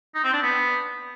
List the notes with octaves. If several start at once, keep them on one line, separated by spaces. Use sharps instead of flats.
D#4
C4
D4
B3